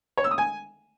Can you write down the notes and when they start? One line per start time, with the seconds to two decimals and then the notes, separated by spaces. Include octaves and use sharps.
0.17 C#5
0.24 E6
0.31 D#6
0.38 G#5